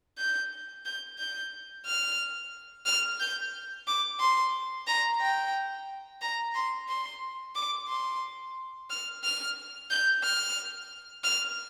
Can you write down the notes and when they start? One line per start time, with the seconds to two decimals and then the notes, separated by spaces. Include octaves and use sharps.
0.18 G6
0.85 G6
1.18 G6
1.86 F6
2.86 F6
3.20 G6
3.87 D6
4.20 C6
4.87 A#5
5.21 G5
6.22 A#5
6.55 C6
6.89 C6
7.55 D6
7.89 C6
8.90 F6
9.24 F6
9.90 G6
10.24 F6
11.24 F6